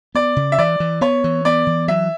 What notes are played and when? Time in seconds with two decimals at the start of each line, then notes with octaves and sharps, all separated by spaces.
0.15 B3 D5
0.36 C#3
0.52 E5
0.58 E3 D5
0.80 E3
1.01 B3 C#5
1.24 E3
1.45 B3 D5
1.67 E3
1.88 F#3 E5